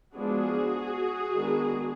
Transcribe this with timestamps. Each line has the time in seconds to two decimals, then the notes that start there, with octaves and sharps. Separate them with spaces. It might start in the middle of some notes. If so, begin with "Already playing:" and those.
0.15 F3 G#3 B3 D4 F#4 G#4
1.34 D#3 G#3 B3 D4